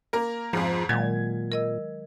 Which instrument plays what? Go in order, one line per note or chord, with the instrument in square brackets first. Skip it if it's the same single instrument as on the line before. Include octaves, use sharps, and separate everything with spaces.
[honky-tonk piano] A#3 A#4
[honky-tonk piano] F2 G#2 [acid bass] F3
[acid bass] A#2 [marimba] D#3 F#3 G#3 [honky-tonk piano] G#6
[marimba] A#4 D#5 E6